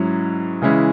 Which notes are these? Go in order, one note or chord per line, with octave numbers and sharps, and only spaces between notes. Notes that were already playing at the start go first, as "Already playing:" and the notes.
Already playing: G#2 F#3 C#4 E4
C#3 E3 G#3 C#4 E4